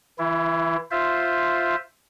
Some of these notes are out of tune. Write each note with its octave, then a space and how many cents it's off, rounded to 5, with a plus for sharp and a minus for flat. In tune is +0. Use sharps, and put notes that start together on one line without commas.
E3 -15 E4 +25
F4 +0 C5 +0 E5 +0